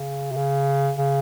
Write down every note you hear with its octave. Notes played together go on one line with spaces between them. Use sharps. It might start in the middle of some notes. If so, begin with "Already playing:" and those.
Already playing: C#3
C3
C#3
C#3